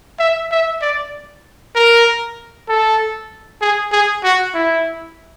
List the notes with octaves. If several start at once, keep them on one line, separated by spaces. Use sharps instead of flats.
E5
E5
D5
A#4
A4
G#4
G#4
F#4
E4